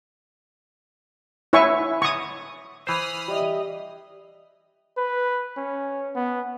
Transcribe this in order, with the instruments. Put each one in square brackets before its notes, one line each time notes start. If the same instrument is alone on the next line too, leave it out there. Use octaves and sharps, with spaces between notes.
[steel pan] E4 C#5 E5 G#5 C#6
C#6 D#6
[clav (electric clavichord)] E3 C5 [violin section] B5 D#6 F6
[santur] G3 [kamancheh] D#5 E5
[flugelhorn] B4
C#4
B3